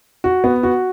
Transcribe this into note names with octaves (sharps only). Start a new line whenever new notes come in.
F#4
B3
F#4